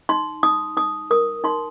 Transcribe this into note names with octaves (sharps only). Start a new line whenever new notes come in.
D#4 C6
D#4 D#6
D#4 D#6
A#4 D#6
D#4 C6